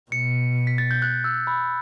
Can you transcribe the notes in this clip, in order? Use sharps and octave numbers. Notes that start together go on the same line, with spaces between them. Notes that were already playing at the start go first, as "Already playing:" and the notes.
B2 C#7
B6
A6
G6
F#6
E6
B5